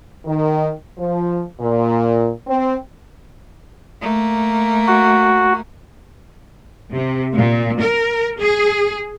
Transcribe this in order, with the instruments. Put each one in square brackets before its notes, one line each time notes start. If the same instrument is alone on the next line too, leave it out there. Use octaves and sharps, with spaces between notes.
[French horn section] D#3
F3
A#2
C4
[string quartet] A3 A#3
[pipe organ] F#4
[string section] C3
A#2
A#4
G#4